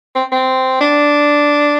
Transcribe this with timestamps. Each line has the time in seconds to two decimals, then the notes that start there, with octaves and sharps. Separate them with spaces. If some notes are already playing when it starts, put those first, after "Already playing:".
0.15 C4
0.32 C4
0.81 D4